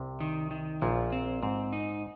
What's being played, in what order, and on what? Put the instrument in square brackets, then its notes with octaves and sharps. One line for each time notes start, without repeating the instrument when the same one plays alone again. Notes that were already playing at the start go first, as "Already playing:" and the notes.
Already playing: [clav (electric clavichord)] C2 C3
[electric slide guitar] D#3
D#3
[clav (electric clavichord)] A#1 A#2 [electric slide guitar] F3
[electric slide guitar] C4
[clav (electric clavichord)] G#2 [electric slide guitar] C4
[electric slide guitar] D#4